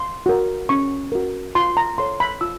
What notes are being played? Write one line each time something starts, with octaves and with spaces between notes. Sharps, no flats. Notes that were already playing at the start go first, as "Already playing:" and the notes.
Already playing: C6
F#4 A#4
C#4 C#6
F#4 A#4
F4 C6
A#5
A4 C#5 C6
B5
F4 E6